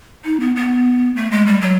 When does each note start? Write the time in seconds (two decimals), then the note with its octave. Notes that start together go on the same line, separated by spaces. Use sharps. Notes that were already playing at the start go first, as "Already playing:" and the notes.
0.25 D#4
0.40 B3
0.56 B3
1.16 A3
1.31 G#3
1.46 G3
1.61 F#3